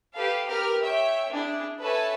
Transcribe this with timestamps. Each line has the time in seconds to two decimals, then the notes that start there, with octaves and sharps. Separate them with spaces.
0.14 G4 A4 B4 F5
0.46 G4 A#4 B4 F6
0.84 C#5 E5 G5
1.32 D4 E4 G#4
1.80 A4 B4 C#5 E5 G#5 A5